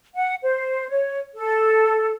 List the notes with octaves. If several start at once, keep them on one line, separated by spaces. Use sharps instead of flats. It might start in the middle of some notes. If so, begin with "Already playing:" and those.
F#5
C5
C#5
A4